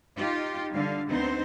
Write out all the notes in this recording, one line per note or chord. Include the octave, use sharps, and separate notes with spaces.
D#4 F4 G4
D3 G3 F5
D2 B3 C4 D#4 C5